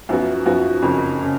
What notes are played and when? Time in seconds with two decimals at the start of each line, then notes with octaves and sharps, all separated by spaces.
0.09 F#2 F3 B3 F#4
0.46 F#2 F3 B3 F#4
0.82 F#1 F2 C#3
1.22 C#3